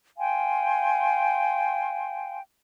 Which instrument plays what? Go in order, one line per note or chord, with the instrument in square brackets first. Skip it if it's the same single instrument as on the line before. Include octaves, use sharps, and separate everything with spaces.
[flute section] F5 G5 G#5 C6